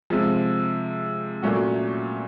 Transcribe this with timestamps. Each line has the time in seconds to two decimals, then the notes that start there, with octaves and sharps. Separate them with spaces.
0.10 C3 F3 G#3
1.42 A#2 F#3 A3 C#4 F#4